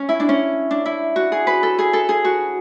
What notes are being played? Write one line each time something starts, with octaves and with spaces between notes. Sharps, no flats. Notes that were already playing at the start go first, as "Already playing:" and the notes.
Already playing: C#4
E4
D4
C#4
D4
E4
F#4
G#4
B4
A4
G#4
A4
G#4
F#4